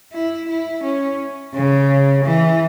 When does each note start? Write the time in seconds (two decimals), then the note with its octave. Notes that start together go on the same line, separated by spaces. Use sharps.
0.13 E4
0.48 E4
0.83 C#4
1.54 C#3
2.25 E3